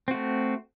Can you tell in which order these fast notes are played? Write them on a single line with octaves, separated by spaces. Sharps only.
C4 F#4 A3